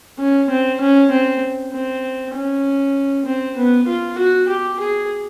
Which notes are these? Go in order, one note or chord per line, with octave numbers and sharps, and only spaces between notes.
C#4
C4
C#4
C4
C4
C#4
C4
B3
F4
F#4
G4
G#4